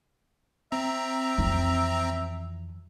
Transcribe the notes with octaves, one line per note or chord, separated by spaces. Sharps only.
C4 E5 A#5
F2 E3